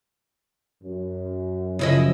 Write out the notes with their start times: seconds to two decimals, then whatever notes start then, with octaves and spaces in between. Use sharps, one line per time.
0.83 F#2
1.79 F#2 C#3 F3 E4 D#5